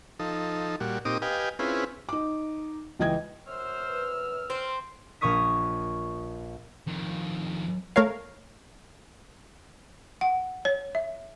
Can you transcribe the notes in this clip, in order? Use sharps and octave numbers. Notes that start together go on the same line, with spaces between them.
F3 D#4 A4
A#2 G3 F#4
A#2 C4 D#4 G4 D6 D#6
G4 B4 D#5 F5 G5 G#5
C4 C#4 E4 F4 G#4 B4
D#4 D6
C#2 E3 D#5 G5 G#6
F#2 C5 E6 F6
B4
C4 C5
A#1 A#2 C#5 C#6 D#6 B6
F2 D#3
A3 A#4 C#5 F5
F#5
C#5
E5